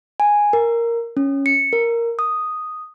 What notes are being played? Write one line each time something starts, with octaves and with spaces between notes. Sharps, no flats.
G#5
A#4
C#4
C#7
A#4
D#6